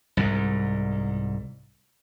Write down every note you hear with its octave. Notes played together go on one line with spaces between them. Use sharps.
C2 G#2